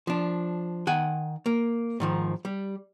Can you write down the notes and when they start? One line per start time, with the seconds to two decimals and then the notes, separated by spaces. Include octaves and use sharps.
0.07 F3 D4
0.87 D#3 F#5 G#5
1.46 A#3
2.00 G#2 D#3 F3
2.45 G3